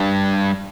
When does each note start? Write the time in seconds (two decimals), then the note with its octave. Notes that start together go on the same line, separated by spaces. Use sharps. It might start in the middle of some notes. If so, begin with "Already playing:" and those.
Already playing: G2